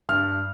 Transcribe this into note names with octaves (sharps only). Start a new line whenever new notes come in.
G2 F6